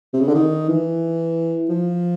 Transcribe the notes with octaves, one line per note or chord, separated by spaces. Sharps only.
C3
C#3
D3
D#3
E3
F3